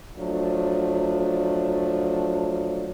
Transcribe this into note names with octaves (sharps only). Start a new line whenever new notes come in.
F3 F#3 A3 D4